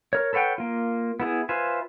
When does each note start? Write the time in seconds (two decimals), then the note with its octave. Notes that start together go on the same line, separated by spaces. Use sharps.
0.13 A#4 C#5
0.33 A4 B4 C#5 F#5 G5
0.58 A#3 F4
1.20 B3 E4 G#4
1.49 F4 B4 C5 E5 G#5